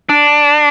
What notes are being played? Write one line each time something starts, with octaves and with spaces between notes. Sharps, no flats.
D4